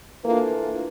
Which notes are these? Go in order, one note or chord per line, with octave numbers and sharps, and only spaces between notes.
E3 A3 A#3 D4 F4